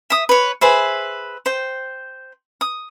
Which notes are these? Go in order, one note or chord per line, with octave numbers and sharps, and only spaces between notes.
E5 D#6
B4 C#5
G#4 B4 C5 E5
C5 G5
D#6